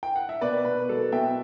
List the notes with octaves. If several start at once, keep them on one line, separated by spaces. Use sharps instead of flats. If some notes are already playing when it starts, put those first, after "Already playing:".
G5
F#5
E5
B2 B4 D5
B2 B4
F#3 A4
B2 E5 G5